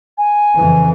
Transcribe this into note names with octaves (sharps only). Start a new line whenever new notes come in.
G#5
F2 C#3 E3